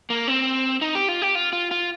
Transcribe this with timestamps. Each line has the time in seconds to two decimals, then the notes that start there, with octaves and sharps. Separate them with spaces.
0.10 A#3
0.28 C4
0.81 D#4
0.95 G4
1.08 F4
1.22 G4
1.35 F4
1.53 F4
1.71 F4